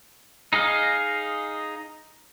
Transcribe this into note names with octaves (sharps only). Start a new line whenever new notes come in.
D#4 G#4 D#5 F5